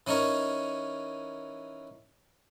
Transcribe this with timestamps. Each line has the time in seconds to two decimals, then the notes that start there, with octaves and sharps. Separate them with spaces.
0.07 E3 C#4 D#4 A#4 C#5